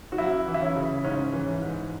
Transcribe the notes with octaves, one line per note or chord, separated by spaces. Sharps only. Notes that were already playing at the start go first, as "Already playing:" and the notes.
F#4
F#2 E4
E3
E4
C#4
C#3
G#2 C#4
E3
G#2